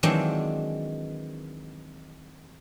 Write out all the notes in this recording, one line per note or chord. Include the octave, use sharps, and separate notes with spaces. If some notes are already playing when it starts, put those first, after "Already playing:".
D#3 E3 F#3 G#3 C4 D4